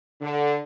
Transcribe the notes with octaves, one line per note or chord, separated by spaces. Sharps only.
D3